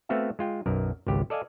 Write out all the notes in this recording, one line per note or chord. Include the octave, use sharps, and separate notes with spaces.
A3 B3 C4 F#4 E5 F5
G#3 F4 G5
B1 F#2 A#4
G#1 C#2 G4
A4 D5 D#5 F5 G#5